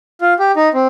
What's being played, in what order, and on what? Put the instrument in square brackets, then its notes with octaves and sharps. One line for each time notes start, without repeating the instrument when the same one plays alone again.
[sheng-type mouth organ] F4
G4
D#4
C4